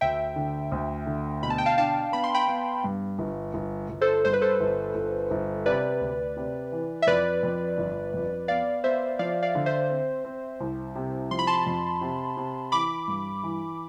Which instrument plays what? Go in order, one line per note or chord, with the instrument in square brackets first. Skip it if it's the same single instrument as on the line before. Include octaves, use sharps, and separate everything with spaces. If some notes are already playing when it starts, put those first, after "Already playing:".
[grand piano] D2 [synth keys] E5 G5
[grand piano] D3
D2
D3
[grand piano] B2 [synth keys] B5
[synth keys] A5
G5
F5 A5
[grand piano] D4 [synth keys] F5 A5
[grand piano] B3 [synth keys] B5
[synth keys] C6
G5 B5
[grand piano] B3
G2
G1
G1
G1
[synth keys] A4 C5
[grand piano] G2 [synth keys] C5
[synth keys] B4
A4 C5
[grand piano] G1
G1
G1
[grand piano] C3 [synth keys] B4 D5
[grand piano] D2
C3
E3
[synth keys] E5
[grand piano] F2 [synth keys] B4 D5
[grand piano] F2
G1
F2
[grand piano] B3 [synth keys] D5 F5
[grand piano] B3 [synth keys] C5 E5
[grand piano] F3 [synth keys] D5 F5
[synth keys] D5 F5
[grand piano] D3
[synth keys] C5 E5
[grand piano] C4
C4
C2
C3
[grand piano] F3 [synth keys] C6
[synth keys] B5
A5 C6
[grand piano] F2
C3
C3
[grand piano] E3 [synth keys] B5 D6
[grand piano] G2
E3